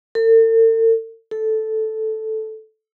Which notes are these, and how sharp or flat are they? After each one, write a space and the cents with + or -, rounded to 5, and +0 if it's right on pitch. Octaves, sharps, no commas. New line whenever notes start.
A4 +45
A4 -5